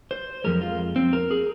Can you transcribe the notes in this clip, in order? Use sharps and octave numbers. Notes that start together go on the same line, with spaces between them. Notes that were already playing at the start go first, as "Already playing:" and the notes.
C5
F2 C3 F3 G#3 A#4
F4
C4
A#4
G#4